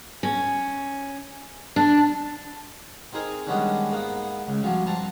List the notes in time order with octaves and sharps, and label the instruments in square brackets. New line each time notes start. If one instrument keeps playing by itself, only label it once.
[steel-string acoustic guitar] C#4
D4
[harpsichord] C4 D#4 G#4 A#4
D#3 G3 G#3 B3 C#4 D4
G#2 A#3 B3
C#2
G2 C3 F3 F#3
G2 C4 A5 A#5